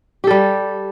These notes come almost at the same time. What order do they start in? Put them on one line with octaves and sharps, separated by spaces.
G4 A4 G3